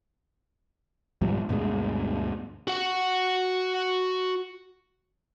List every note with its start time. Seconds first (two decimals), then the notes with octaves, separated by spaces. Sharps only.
1.21 G#2 B2 F3 G3
1.49 D2 G2 B2 G#3
2.68 F#4 F#5